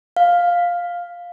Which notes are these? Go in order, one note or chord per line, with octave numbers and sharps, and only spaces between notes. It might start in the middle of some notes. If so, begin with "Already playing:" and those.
F5